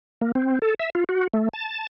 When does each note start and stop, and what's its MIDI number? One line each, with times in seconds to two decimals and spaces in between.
0.21 0.32 58
0.35 0.59 60
0.62 0.74 69
0.80 0.90 76
0.95 1.04 65
1.09 1.27 66
1.33 1.49 57
1.53 1.87 81